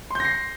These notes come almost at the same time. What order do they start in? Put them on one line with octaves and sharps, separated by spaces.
C6 G6 A#6 C7